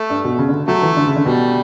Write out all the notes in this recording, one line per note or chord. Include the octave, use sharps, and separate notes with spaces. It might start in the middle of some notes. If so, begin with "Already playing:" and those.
Already playing: A3
G2
B2
C#3
D3
F#3 A3
E3
D3
C#3
D3
B2 G3